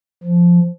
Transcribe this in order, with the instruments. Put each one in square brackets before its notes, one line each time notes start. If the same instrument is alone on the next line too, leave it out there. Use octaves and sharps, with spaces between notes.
[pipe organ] F3